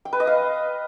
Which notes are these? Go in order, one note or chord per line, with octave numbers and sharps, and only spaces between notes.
G5
B4
D#5
F5